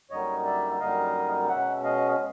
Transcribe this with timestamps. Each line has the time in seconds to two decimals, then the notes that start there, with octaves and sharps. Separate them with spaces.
0.10 F#2 D3 G3 A#3 D#4 C#5 D#5
0.45 D5 E5
0.80 F#2 D3 G3 A#3 D#4 D#5 F5
1.48 B2 G#3 C#4 E5 F#5
1.84 D#5 F5